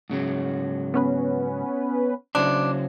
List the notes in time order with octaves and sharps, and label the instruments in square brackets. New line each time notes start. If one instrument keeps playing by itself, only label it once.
[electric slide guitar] G#2 C#3 F#3
[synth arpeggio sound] B3 C#4 B4
[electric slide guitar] C#3 F#3 C5 [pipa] D4